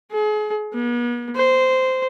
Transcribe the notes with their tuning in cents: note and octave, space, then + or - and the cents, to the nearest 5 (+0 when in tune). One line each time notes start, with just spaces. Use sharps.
G#4 +35
B3 -45
C5 -10